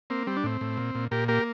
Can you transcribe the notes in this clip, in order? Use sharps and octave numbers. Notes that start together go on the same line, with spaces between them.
A#3 C4
G3 C4
D4
A2 C4
A2
A#2
A#2
A#2 G4 A#4
A#3 G4 A#4